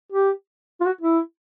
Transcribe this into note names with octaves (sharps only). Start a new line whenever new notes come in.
G4
F4
F#4
E4